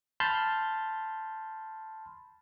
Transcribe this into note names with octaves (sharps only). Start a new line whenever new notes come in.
A5 B5 C6 F6 G6